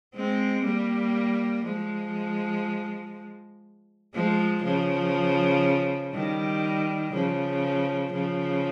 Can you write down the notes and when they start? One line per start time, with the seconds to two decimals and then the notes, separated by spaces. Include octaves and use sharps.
0.15 G#3 C4
0.65 G3 A#3
1.65 F3 G#3
4.14 F3 G#3
4.64 C#3 F3
6.13 D#3 G3
7.13 C#3 F3
8.13 C#3 F3